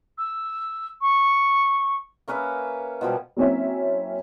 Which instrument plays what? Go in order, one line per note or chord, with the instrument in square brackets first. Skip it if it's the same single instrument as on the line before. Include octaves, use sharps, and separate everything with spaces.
[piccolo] E6
C#6
[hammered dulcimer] A#3 C#4 B4 E5
B2 F3 G3
[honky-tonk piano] F#3 A#3 C4 C#4 E4 E5